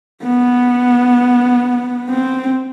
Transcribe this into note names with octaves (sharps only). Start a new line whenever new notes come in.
B3
C4